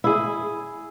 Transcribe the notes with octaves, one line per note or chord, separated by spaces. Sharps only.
E4 G#4